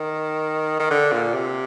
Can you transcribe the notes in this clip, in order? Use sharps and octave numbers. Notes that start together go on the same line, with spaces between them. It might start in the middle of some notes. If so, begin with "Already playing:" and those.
Already playing: D#3
D#3
D3
A#2
C3